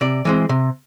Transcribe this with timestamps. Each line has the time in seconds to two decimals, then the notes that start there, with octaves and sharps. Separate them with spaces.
0.01 C3 D5
0.25 E3 G#3 C4
0.49 C3